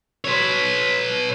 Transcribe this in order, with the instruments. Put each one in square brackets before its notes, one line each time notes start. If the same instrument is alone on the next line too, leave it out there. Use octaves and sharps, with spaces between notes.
[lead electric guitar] B4 C#5